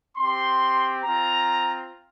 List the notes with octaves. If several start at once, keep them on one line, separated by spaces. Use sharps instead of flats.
C4 G4 C6
C4 F4 A#5